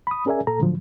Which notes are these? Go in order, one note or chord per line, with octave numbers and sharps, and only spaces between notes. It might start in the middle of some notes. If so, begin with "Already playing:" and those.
B5 D#6
C#4 G#4 A#4 D5 E5 G#5
A#2 A4 A#5
A2 D3 F3 F#3